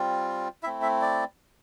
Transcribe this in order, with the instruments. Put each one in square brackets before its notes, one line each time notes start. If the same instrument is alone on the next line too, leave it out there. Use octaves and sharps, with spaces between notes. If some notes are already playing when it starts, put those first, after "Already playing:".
Already playing: [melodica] G3 C4 F4
E4 E5
A3 C4
E5
D5